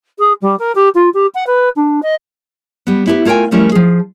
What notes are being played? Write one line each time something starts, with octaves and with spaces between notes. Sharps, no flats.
G#4
G3
A#4
G4
F4
G4
F#5
B4
D4
D#5
G3 B3
B3 E4 G4 G#4 B4
A3 F4 A#4 F5 G5 G#5
F3 G3 A3 C#4 E4 A#4
F3 G#4